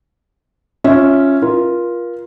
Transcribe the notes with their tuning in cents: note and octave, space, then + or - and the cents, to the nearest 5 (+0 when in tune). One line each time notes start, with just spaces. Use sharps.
C#4 +0 F4 +5 E5 -5
F4 +0 A#4 +35